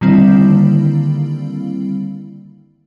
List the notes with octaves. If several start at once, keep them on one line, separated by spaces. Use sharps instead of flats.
D3 D#3 G3 A#3 C4 E4